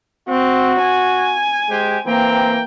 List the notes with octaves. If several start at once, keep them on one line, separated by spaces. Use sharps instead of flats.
C4 F#4
G#5
G#3 G4 C5
E3 A#3 C4 G5 A#5